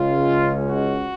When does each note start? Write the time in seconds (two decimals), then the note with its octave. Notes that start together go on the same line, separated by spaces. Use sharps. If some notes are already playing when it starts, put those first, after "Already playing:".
Already playing: C#2 C#3 G#3 C#4 F4
0.66 F#4